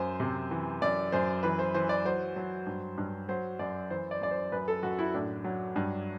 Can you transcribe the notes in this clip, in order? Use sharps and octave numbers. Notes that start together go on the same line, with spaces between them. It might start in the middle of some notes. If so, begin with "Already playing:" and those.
Already playing: F#2 C5
C3
E3
F#2 D5
F#2 C5
E3 B4
C5
E3 C5
D5
F#3 C5
F#3
G2
G2
F#3 C5
F#2 D5
E3 C5
D5
F#2 D5
C5
F#2 B4
A4
F#2 F#4
E4
A2 D4
F#3
G2